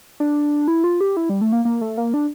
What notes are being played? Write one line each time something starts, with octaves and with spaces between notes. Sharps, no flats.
D4
E4
F4
G4
E4
G3
A3
A#3
A#3
A3
A#3
D4